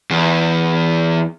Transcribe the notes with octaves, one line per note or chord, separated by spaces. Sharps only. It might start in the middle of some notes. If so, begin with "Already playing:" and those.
E2